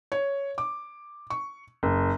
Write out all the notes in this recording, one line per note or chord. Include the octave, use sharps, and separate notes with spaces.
C#5
D6
C#6
F#1